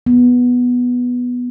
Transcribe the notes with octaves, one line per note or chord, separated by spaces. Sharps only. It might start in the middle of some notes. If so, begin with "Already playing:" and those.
B3